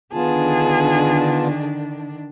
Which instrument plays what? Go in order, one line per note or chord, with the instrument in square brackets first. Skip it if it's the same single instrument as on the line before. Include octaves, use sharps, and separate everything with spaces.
[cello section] D3 D#3 D4 [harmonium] B3 F4 A5 [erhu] G#4